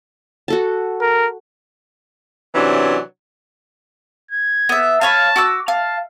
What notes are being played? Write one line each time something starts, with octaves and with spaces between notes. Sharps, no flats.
F#4 A4 A5
A#4
C3 E3 F#3 C#4 D4
G#6
B3 E5
B4 C#5 F5 A5
F#4 D6 E6
F5 A5